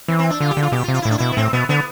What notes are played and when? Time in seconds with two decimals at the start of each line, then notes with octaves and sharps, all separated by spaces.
0.08 E3 C4
0.19 C4
0.30 D4
0.40 D3 F4
0.51 G4
0.57 D3
0.62 F4
0.72 B2 G4
0.84 F4
0.88 C3
0.94 F4
1.02 A2 E4
1.11 D4
1.18 B2 E4
1.32 B3
1.37 A2 C4
1.53 B2 B3
1.69 D3 B3